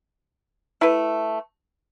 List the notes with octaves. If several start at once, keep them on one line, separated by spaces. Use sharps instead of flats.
A3 E4 B4